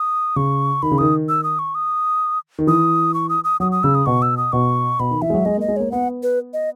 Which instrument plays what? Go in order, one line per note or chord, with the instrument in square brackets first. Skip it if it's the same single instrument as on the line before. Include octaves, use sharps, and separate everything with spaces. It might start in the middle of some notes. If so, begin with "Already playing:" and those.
Already playing: [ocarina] D#6
[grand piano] C#3 [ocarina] C#6
[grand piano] D#3 [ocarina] B5
[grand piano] C#3
[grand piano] D#3 [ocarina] D#6
[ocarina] E6
D#6
C#6
D#6
[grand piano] D#3
[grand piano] E3 [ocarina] D#6
[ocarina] C#6
D#6
D#6
[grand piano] F#3 [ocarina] D#6
[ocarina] D#6
[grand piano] C#3 [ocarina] E6
[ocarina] D#6
[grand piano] B2 [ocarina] C#6
[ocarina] E6
D#6
[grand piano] B2 [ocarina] C#6
[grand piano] B2 [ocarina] B5
[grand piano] D#3
[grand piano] E3 [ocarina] E5
[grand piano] G#3
F#3
[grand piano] G#3 [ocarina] D#5
[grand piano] A#3
[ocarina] D#5
[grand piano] G#3
[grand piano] A#3 [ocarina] C#5
[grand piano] B3 [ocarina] F#5
[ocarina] B4
D#5